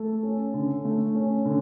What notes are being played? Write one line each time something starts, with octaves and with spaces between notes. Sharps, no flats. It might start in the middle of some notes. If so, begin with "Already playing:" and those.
Already playing: A3 A4
C#4
D3
A3
C#4
D3